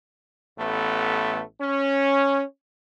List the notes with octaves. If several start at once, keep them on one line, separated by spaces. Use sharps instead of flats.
A1 A3 B3
C#4